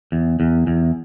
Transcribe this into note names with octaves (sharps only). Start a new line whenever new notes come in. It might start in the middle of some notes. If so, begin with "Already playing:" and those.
E2
E2
E2